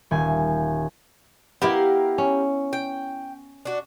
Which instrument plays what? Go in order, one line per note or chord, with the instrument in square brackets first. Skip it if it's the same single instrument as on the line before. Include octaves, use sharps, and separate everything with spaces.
[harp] D#1 G#5
[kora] B3 E4 [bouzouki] G4 A#4 F5
[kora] C#4
[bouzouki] G5
D4 F#4